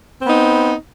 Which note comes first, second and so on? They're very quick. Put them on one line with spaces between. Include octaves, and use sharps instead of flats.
C4 B3 D#4